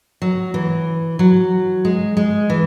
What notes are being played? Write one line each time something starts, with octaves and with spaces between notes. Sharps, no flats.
F#3
E3
F#3
G#3
G#3
E3